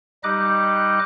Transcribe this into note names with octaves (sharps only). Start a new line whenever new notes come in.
G3 D#4 G4 D#5 D6 F#6